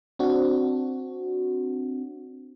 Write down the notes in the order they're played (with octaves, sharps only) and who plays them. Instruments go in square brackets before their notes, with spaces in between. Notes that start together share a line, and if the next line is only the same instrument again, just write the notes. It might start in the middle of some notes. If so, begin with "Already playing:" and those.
[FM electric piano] C4 D4 F#4